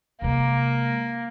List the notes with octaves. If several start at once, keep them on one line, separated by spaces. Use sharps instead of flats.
C3 G#3 A#3